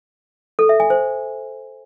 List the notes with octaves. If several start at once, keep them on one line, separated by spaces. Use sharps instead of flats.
A4
E5
G#5
C5